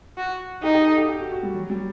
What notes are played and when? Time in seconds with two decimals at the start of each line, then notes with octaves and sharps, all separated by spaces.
0.18 F#4
0.63 D#4 G4
0.75 G4
0.86 A4
0.98 G4
1.09 G4
1.20 F#4
1.32 F#4
1.43 G3
1.54 F#3
1.70 G3